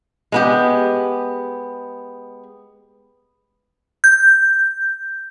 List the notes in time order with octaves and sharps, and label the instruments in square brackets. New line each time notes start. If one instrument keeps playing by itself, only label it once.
[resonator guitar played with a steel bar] G#3 B3 G4
[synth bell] G6